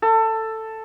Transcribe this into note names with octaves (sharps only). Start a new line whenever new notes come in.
A4